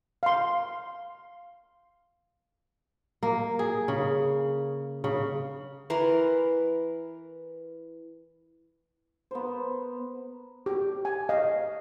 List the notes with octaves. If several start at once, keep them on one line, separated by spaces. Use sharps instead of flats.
F5 C6
A#3
G#4
C#3
C#3
E3 A#4 B4 C6
B3 A#4 C5
G4
G#5
D#5 F5